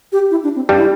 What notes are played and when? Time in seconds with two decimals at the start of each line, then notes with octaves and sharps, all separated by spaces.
0.12 G4
0.31 E4
0.44 D4
0.56 C4
0.69 G2 G3 D4
0.78 E4